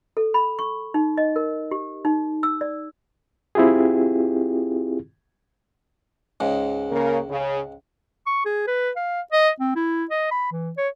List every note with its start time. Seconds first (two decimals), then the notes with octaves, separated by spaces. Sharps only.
0.17 A4
0.34 B5
0.59 C#6
0.94 D#4
1.18 D#5
1.36 A#4
1.71 G4
2.05 D#4
2.43 E6
2.61 D5
3.55 C4 E4 F4 G4 G#4
6.40 C#2 G#2
6.91 C#3 A#3 A#4
7.30 C#3
8.27 C#6
8.45 G#4
8.67 B4
8.96 F5
9.32 D#5
9.60 C4
9.75 E4
10.11 D#5
10.31 B5
10.52 E3
10.77 C#5